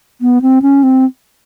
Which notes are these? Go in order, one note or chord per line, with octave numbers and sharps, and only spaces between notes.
B3
C4
C#4
C4